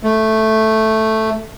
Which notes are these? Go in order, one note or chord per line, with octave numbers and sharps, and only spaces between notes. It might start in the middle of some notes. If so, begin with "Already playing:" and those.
A3